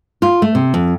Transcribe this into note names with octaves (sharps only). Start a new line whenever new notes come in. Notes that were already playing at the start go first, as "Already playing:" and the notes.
F4
A3
C3
F2